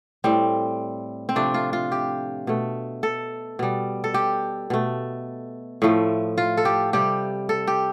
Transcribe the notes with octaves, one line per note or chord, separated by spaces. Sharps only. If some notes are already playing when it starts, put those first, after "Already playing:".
A2 G3 C4
C4
C3 F3 A3 D4
F4
F4
G4
B2 A3
A4
B2 G3
A4
G4
B2 A3
A2 F3 A3
F4
A4
G4
C3 G3 G4
A4
G4